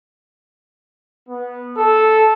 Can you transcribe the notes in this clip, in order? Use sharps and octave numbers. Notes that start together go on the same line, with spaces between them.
B3
A4